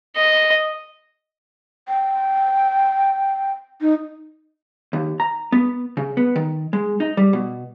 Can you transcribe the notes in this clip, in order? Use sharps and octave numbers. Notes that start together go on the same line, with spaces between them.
D#5
G5
D#4
D#2
A#5
B3
C#3
B3
D#3
G#3
D#4
G3
B2